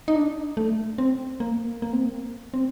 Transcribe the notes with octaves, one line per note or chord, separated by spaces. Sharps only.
D#4
D4
A3
C4
A#3
A#3
C4
A#3
C4